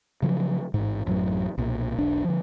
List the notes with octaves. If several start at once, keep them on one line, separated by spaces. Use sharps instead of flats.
C#3 F3 F#3
A1 G#2
A1 F#2 A2 F#3
B1 A#2
E1 B1 D4
D3 F3